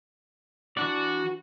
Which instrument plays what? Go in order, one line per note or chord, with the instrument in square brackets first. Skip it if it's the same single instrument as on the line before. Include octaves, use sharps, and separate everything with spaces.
[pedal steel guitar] E3 D4 D5 [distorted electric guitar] F#4